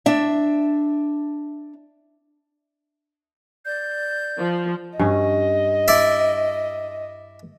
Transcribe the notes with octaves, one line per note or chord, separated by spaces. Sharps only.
D4 E5
D5 G6
F3
G2 C#4 D#5
E4 D5 E5